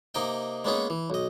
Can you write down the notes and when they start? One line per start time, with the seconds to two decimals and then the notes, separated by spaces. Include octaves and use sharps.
0.15 C3 A#3 D#4 D#5 G5
0.65 G#3 A#3 B3 C#4 D#4 G#4
0.90 E3
1.10 B1 D#5